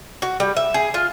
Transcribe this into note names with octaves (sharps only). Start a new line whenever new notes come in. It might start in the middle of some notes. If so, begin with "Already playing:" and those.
F#4
G3
E5
G#4
F4